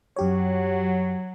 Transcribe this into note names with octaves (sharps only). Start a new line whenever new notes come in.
F#2 F#3 G4 C#5